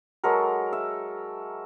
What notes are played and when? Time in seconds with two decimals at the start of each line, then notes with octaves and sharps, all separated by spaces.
0.24 F#3 G#3 A4 A#4
0.73 E5